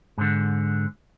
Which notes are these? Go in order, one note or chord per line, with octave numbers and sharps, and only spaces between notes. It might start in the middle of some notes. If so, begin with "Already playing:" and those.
G#2 D3